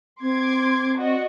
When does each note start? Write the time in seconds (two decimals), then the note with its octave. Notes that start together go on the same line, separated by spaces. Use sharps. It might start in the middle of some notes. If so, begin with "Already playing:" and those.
0.21 C4 C6 D6 G#6
0.98 F#4 D5 D#5